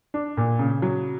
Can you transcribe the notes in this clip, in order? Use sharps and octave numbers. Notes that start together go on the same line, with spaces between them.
D4
A#2
C#3
F#3